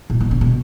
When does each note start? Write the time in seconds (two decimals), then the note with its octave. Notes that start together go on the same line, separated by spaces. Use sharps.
0.10 A#2
0.21 B2
0.31 C#3
0.41 B2